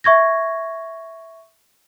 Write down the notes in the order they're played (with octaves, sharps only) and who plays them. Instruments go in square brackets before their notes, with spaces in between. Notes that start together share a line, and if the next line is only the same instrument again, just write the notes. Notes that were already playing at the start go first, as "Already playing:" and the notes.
[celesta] E5 C#6 G#6 A#6